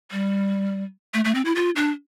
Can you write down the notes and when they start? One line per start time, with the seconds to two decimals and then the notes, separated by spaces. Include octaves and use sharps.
0.11 G3
1.14 A3
1.25 A3
1.35 C4
1.45 E4
1.56 F4
1.76 D4